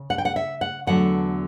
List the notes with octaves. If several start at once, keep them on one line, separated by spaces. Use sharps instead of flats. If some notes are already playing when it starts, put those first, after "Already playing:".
Already playing: C#3
F#5
G5
F#5
E5
F#5
E2 D3 F#3 A3 F#5